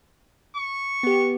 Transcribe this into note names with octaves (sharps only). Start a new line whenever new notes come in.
C#6
B3 G4